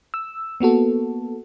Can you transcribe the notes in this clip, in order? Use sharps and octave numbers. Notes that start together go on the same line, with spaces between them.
E6
A#3 B3 F#4 A4